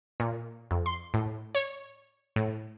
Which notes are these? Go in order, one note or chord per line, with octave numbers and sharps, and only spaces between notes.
A#2
F2
C6
A2
C#5
A2